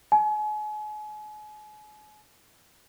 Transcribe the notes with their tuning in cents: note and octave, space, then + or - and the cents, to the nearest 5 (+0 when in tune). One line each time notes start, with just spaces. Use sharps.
G#5 +40